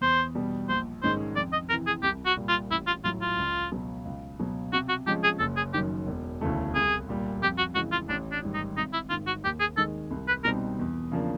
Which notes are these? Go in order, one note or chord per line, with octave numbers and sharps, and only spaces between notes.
E2 C5
B2 G3
A#1 C5
G#2 D#3 G#3 C#4 C5
F2 D5
D#5
C3 E3 A#4
G#4
C2 G4
F#4
A#2 G3
F4
A1 E4
F4
A2 F#3 F4
F4
C#2
B2 F#3
C#2
B2 F#3
C3 F#4
F#4
F3 G#3 C#4 G4
G#4
F#1 A4
G#4
F#2 D#3 G4
E1
D2 C#3 E3 A3
C2 G#4
A#2 G3
F2 G4
F#4
C#3 E3 G#3 F#4
F4
A1 D4
D4
G#2 D#3 G3
D#4
G#1 D#4
E4
G#2 D#3 F4
F#4
D#2 G4
G#4
D#3 G#3 A4
C2
B4
B2 G3 C4 D#4 A#4
E2
C#3 F3 A#3 D4